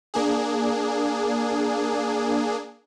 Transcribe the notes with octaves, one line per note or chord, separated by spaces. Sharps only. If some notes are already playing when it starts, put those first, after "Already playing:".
A#3 D4 G#4